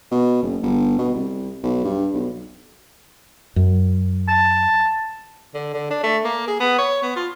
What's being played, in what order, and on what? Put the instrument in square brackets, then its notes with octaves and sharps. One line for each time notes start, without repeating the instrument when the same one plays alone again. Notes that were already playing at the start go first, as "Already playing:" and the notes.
[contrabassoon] B2
F#1
G1
B2
C2
B1
G2
B1
[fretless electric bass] F#2
[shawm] A5
[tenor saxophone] D3
D3
D4
A3
A#3
G#4
B3
C#5
B3
F4